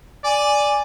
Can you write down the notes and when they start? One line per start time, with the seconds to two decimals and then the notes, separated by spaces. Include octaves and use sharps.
0.24 D5 G#5